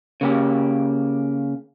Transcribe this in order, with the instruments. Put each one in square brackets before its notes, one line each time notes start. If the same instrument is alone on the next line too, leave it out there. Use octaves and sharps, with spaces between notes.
[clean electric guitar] C#3 A#3 G4